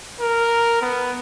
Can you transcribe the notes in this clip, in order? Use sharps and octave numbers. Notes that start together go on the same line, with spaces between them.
A#4
B3